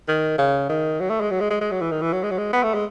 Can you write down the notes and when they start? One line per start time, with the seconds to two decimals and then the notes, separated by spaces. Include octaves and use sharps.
0.08 D#3
0.38 C#3
0.69 D#3
1.00 F#3
1.10 A3
1.21 G#3
1.31 F#3
1.40 G#3
1.50 G#3
1.61 G#3
1.71 F#3
1.81 E3
1.91 D#3
2.02 E3
2.13 F#3
2.23 G#3
2.31 F#3
2.38 G#3
2.53 B3
2.63 A3
2.74 G#3